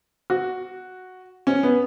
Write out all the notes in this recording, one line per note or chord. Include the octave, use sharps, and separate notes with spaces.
F#4
C#4
B3